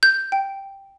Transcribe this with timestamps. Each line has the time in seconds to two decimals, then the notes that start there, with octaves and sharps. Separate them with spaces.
0.03 G6
0.32 G5